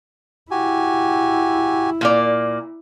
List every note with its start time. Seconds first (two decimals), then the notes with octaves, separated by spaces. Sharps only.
0.51 E4 F#4 G4 G#5
2.01 A#2 A#3 D5